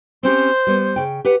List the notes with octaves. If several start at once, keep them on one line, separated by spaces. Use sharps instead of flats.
C4 C#4 G4 C5
G3 B3
C#3 G5
G4 B4 F#5